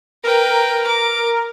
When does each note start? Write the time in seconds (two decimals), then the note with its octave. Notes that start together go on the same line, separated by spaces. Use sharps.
0.24 A#4 B4 G5
0.87 D6